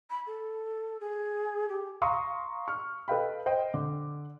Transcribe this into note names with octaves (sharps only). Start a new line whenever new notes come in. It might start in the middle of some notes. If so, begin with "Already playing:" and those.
B5
A4
G#4
G4
F5 A#5 C6 C#6 D#6
C#6 F6
A4 B4 D#5 F5 G5 B5
C5 D#5 G5
D3 D6